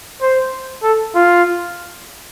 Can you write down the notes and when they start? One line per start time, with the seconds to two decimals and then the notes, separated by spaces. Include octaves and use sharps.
0.22 C5
0.83 A4
1.15 F4